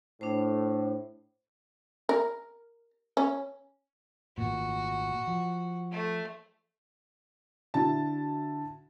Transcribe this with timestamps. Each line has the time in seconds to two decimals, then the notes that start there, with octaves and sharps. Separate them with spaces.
0.21 A2 D4 C5
2.09 A#4
3.17 C#4
4.38 G#1 A#2 F#4
5.27 F3
5.91 A3
7.74 D3 E4 F#4 A5